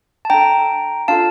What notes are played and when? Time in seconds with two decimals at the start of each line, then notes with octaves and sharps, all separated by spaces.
0.25 A5
0.30 D4 A4 G5 A#5
1.08 D4 F4 A4 F5 A5